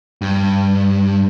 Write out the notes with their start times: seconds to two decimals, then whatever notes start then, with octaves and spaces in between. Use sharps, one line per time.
0.22 G2